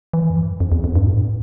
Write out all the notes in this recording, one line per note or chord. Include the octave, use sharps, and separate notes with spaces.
E3
F2
G2
F2
E2
F2
G2
A2